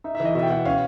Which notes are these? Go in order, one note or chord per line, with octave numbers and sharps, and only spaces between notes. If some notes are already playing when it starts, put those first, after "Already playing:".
D#4 E5
E5
E3
D#5
B2 E5
G5
B2 F#5
C#4 F5